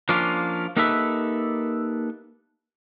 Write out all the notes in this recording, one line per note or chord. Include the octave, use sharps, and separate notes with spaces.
F3 A#3 C#4 D4 F4
A#3 D#4 G4 A4 B4 E5